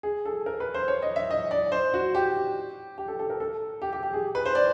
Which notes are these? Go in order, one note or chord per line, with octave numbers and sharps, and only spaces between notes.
G#4
A4
A#4
B4
C5
C#5
D#5
E5
D#5
D5
C5
F#4
G4
G4
A4
A4
A#4
A4
G4
G4
G4
G#4
B4
C5
D5